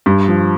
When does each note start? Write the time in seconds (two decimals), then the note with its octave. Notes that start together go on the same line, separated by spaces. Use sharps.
0.06 G2
0.28 F3